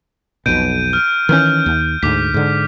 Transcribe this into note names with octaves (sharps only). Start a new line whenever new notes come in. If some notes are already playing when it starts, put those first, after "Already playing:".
B1 F2 B2 G6 D7 D#7
F6
D#3 E3 C#4 F6 G6
D#2
D2 G#2 D6 B6
G#2 D3